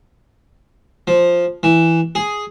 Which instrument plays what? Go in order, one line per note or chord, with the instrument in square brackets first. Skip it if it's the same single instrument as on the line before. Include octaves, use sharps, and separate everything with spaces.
[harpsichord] F3
E3
G#4